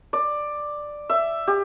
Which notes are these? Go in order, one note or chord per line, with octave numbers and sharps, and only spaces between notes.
D5
E5
G4